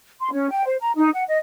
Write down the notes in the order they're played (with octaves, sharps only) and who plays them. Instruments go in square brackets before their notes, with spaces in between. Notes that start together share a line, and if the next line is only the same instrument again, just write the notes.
[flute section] C6
C#4
G5
C5
A#5
D#4
F#5
D#5